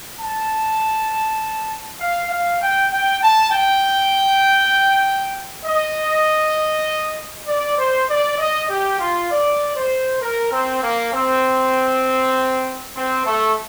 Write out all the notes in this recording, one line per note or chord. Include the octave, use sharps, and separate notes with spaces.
A5
F5
F5
G5
G5
A5
G5
D#5
D5
C5
D5
D#5
G4
F4
D5
C5
A#4
C4
A#3
C4
C4
A3